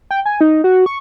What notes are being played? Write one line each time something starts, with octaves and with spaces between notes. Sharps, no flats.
G5
G#5
D#4
F#4
C#6